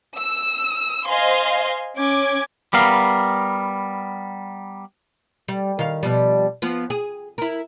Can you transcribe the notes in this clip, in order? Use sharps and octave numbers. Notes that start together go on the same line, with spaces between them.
E6
C5 D#5 F5 G#5 C6
C#4 D6 G#6
G3 B3 A#4 F5
G3
D#3 F5
B2 F3 G3
F3 B3
G#4
E4 A#4